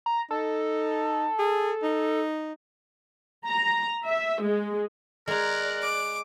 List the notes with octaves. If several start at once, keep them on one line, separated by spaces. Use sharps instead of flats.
A#5
D#4 A4
G#4
D#4
A#5
E5
G#3
G#3 A#4 D5 A#5 F#6
D6